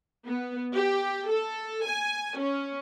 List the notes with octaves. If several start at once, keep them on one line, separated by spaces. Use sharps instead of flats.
B3
G4
A4
G#5
C#4